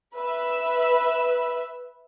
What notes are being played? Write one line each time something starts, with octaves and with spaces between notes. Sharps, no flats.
B4 E5